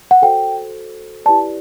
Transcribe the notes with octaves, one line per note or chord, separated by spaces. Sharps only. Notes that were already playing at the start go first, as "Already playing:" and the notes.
F#5
F#4 A4 C5 G5
E4 G4 B4 D5 A5